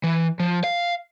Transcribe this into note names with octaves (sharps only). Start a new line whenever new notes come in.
E3
F3
F5